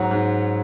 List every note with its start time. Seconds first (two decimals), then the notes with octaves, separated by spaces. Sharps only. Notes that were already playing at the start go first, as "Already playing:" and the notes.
Already playing: G#2 F#3 F#5
0.11 G#2